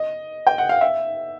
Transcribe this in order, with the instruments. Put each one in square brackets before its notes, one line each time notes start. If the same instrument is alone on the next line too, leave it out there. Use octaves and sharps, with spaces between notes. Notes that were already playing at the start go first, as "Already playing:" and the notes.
Already playing: [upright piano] D#5
G5
F#5
F5
E5